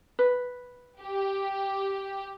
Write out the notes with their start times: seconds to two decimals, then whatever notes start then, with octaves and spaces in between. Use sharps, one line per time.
0.19 B4
1.00 G4